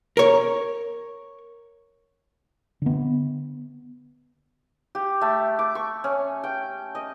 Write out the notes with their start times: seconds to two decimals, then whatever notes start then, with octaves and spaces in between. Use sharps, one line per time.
0.17 A#4 C#5
2.82 D3 B3
4.95 G4
5.21 A3
5.59 D6
5.75 C#6
6.04 C#4
6.44 G5
6.95 D#5